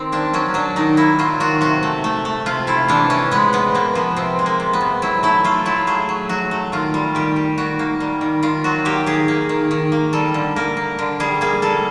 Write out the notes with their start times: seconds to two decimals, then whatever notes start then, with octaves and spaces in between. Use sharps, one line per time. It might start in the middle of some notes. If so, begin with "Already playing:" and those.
Already playing: D#3 C4
0.12 A#3 D4
0.34 F#3 C#4
0.54 F#3 D4
0.76 D#3 D#4
0.97 A#3 E4
1.19 F#3 F4
1.40 D#3 F#4
1.61 C3 F#4
1.83 A3
2.04 A3
2.25 A3
2.46 C3 F4
2.67 C3 E4
2.88 E3 D4
3.10 E3 C#4
3.31 G#3 B3
3.53 C3 B3
3.75 C3 A#3
3.95 F3 B3
4.16 C3 C4
4.39 G#3
4.46 A#3
4.60 C3
4.73 B3
4.81 C3
5.02 F#3 E4
5.23 A3 E4
5.44 A3 F4
5.65 F#3 E4
5.87 A3 G#4
6.09 F#3
6.29 F#3 F#4
6.51 A3
6.72 D#3 F4
6.94 G3
7.15 D#3 G4
7.36 G3
7.58 D#3 F#4
7.79 A#3
8.00 G3
8.21 D#3
8.43 D#3 F4
8.64 F#3 F#4
8.85 A#3 G4
9.06 D#3 G#4
9.28 A#3
9.49 D#3
9.71 D#3
9.92 A#3
10.13 G3 A4
10.34 D3
10.56 A#3 A#4
10.77 A#3
10.99 D3
11.20 G3 G#4
11.41 A#3 G#4
11.62 G3 A4